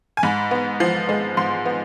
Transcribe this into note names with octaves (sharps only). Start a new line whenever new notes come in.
G#5
G#2 B5
B3
F3
G#3
G#2 C6
B3